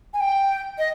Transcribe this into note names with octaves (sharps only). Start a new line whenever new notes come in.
G#5
G5
D#5